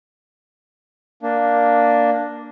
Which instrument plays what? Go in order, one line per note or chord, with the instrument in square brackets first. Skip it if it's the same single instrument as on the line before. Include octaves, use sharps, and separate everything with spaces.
[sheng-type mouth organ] A#3 D4